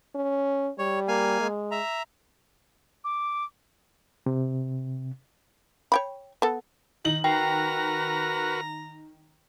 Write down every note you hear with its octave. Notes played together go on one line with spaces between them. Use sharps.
C#4
G3 C#5
A#3 F5 G#5
G#3
E5 A#5
D6
C3
C#5 G5 B5
B3 A4
D#3 D#4 F#7
F#4 A#4 B4 G5 A#5